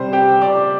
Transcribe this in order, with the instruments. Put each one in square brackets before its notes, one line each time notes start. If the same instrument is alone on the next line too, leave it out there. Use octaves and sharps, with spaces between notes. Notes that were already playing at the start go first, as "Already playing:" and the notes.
Already playing: [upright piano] C3 G3 C5
G4 G5
D5 D6